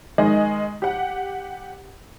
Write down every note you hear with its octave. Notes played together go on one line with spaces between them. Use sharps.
D#3 G#3 D#5
G4 F#5